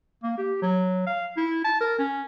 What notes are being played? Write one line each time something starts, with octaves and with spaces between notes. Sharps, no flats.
A#3
G4
F#3
F5
E4
A5
A#4
C#4